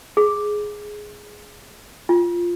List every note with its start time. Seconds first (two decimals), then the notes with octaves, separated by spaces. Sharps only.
0.17 G#4
2.09 F4